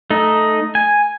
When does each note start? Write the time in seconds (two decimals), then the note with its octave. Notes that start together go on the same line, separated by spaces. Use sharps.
0.10 A3 D#4
0.75 G#5